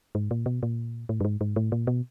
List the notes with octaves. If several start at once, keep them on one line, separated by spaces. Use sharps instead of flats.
G#2
A#2
B2
A#2
A2
G2
G#2
G#2
A2
A#2
B2